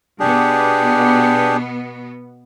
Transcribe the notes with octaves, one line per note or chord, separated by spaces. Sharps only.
B2 B3 D4 G4 G#4